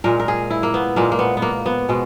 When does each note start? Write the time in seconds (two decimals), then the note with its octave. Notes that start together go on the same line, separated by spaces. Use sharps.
0.04 A#2 G#3 A#4
0.20 A#4
0.28 G#4
0.50 E4
0.63 A#3
0.74 B3
0.96 A#2 G#3 A#3
1.12 A#3
1.19 B3
1.37 B3
1.42 A#3
1.66 B3
1.89 B2 G#3